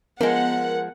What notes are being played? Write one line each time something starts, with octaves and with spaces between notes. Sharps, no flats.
F3 G#3 B3 A#4 F#5